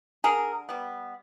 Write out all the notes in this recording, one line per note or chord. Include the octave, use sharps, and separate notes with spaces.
D3 G#4 A#4
G3 B3